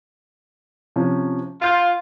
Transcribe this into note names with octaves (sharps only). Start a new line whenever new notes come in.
C3 F3 C#4
F4 C6 G6